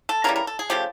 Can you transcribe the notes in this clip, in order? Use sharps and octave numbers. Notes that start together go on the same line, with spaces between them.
A4
C#3 E3 G3 A#4
A#4
A4
G#4
C#3 F3 A3 G4